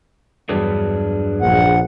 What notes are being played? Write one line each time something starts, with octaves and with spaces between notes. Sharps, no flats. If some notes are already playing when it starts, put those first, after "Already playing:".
E2 G2 F#3 D4 G#4 B4
A#1 F#5